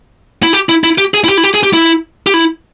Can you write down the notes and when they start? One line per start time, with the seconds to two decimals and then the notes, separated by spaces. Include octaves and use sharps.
0.43 E4
0.53 G4
0.69 E4
0.84 E4
0.98 G4
1.14 G#4
1.24 E4
1.29 G4
1.38 E4
1.44 G4
1.54 G#4
1.63 G4
1.73 E4
2.27 G4
2.34 E4